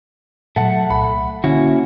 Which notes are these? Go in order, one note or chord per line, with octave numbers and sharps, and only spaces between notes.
A#2 F3 F#3 A3 F#5 A5
C2 B5
A#2 D3 A#3 C#4 E4 F#4